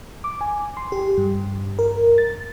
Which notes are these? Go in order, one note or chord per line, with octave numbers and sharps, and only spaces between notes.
D6
G#5
C6
G4
G2
A#4
A6